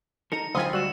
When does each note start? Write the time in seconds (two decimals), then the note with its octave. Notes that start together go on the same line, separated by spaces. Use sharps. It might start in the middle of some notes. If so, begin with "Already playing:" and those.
0.32 D#4 A4 A#4 A#5 C#7
0.55 D2 F#3 C4 D#4 F4 G#5 B5 D#6
0.73 G3 F#4 E6 E7